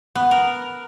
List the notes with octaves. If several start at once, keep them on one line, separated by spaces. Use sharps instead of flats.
B3
A#4